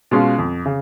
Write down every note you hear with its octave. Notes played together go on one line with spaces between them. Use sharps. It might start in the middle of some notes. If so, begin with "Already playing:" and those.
B2 G#3 C#4 F4
F2
C#3